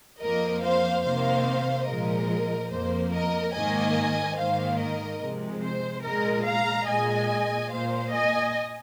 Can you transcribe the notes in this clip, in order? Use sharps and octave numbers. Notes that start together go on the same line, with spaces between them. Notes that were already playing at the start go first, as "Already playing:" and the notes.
F2 F3 A#3 A#4 D#5
C5 F5
C3 D#3 A#3 C5 F5
A#2 F3 G#3 A#4 D#5
F2 F3 A#3 C5
A#4 D#5
G#2 D#3 A#3 D#5 G#5
G#2 D#3 A#3 C5 F5
A#4 D#5
C3 F3 G#3
C5
A#2 G#3 A#4 D#5
F5 A#5
A#2 G#3 D#5 G#5
A#2 A#3 C5 F5
D#5 G#5